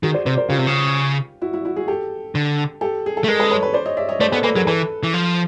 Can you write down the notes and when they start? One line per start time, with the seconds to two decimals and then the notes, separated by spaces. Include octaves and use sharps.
0.03 D#3 F#4 G#4
0.14 C5 D5
0.26 C3 C5 D5
0.37 A#4 C5
0.48 C#3 F4 G4
0.58 C3
0.67 C#3
1.42 E4 F#4
1.53 E4 F#4
1.65 E4 F#4
1.76 F#4 G#4
1.88 G4 A4
2.35 D3
2.81 G4 A4
3.06 G#4
3.17 A4
3.24 A3
3.28 G#3 A#4
3.39 A4 B4
3.51 B4 C#5
3.63 B4 C#5
3.74 C5 D5
3.86 C#5 D#5
3.97 D5 E5
4.09 C#5 D#5
4.20 A3 C5 D5
4.32 B3 A4 B4
4.43 A#3 A4 B4
4.55 F#3 G#4 A#4
4.67 E3 A4 B4
5.03 E3
5.14 F3